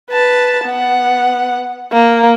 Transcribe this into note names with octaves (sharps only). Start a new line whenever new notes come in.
B4 A5
B3 F#5
A#3